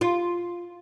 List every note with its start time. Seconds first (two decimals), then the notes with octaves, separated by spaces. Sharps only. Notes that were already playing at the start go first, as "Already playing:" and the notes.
0.01 F4